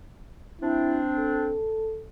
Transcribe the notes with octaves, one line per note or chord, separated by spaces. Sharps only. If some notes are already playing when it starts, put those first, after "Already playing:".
C4 D4 E4
A4